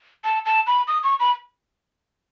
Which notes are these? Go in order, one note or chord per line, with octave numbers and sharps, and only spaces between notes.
A5
A5
B5
D#6
C#6
B5